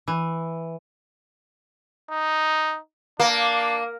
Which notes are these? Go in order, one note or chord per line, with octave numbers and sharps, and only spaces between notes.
E3
D#4
A#3 D4